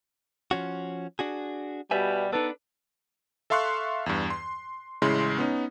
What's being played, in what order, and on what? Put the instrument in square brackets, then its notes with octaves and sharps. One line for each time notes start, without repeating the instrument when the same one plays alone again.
[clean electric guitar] F3 C#4 F#4
D4 F#4 G#4
[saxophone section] B2 G3 [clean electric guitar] B4 E5 G#5
[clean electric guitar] B3 D#4 [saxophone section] D4 A4 B4
[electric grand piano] A4 E5 F5 C6 C#6 F#6
E2 G2
C6
A1 C#3 G#3 E4 C6
B3 C#4 D#4